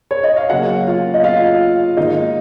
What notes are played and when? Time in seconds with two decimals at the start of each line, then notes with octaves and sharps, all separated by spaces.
0.11 C#5
0.24 D#5
0.37 F5
0.50 C#3 F#3 A#3 C#4 F#4 F#5
0.87 F4 F5
1.14 D#5
1.24 F4 F5
1.97 G#2 D#3 A#3 D#4 D#5